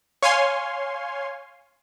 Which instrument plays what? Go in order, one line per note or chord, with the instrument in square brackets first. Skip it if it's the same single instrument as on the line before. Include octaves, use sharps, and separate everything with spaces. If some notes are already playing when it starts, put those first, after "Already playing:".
[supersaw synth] C#5 F5 G#5 C6